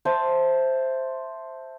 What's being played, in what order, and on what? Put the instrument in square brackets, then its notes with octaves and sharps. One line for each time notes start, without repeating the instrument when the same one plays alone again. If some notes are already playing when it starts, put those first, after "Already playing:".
[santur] C5 E5 A5